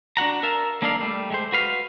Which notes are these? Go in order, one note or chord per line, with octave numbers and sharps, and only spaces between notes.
D4 F#4 F#5 A#5
A#4 E5 F5 A5
A#3 D4 D#4 A4 D5 F5
G3 A3
G#3 A3 C5
F#4 B4 F5